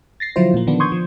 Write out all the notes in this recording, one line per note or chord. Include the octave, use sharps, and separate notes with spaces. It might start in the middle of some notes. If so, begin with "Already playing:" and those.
A6 A#6 C7
D3 F3 F#3 E4 F4 C5
A#2 A#3
D3 D#3 F3 B3 D4
C6 C#6 D#6 G6 G#6
F3